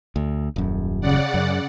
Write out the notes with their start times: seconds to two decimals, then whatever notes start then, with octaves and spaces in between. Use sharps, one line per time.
0.16 D2
0.56 D#1 F#2
1.01 C#3 D5 F#5
1.34 F#2